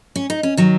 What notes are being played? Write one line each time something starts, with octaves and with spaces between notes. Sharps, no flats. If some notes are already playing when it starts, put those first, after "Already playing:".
C#4
D#4
C#4
D#3 F#3